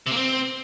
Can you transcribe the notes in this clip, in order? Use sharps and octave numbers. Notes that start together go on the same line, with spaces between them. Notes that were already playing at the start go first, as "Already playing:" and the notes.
C3
A#3
C4